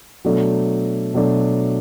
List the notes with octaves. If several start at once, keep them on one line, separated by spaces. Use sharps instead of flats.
B2 F#3 A3 D4
B2 F#3 A3 D4